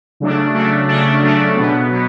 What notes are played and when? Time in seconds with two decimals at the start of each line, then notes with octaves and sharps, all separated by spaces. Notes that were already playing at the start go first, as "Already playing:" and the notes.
0.20 C#3 F#3 A3 D4
0.54 C#3 F#3 A3 D4
0.89 C#3 F#3 A3 D4
1.22 C#3 F#3 A3 D4
1.56 B2 F#3 B3
1.90 B2 F#3 B3